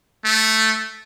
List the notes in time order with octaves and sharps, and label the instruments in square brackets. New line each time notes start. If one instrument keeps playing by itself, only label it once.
[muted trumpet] A3